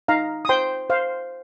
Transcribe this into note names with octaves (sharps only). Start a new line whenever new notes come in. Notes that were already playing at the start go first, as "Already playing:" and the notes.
D#4 F5 A#5
D#6
C5 G5 C6
C5 F5